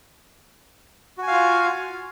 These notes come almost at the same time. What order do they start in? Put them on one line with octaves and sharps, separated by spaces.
F#4 G#5 F5 F4